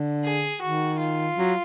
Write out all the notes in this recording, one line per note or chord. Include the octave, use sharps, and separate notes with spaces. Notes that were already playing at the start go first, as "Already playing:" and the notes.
Already playing: D3
G#4
D#3 F#4
F4
F#3